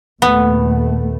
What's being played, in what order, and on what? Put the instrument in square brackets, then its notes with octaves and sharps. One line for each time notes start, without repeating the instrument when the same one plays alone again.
[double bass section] D#2 A#2 A3 [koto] B3